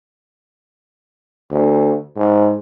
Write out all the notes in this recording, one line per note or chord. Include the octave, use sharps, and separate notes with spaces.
D2
G#2